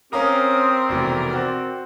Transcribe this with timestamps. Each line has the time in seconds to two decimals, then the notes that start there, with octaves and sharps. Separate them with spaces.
0.13 C4 C#4 G4 A#4 F5 A#5 D#6
0.89 F1 B2 E3 D5
1.33 C4 F#4